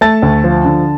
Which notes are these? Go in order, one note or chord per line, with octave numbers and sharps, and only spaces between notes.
A3 A5 A6
D2
F3
D3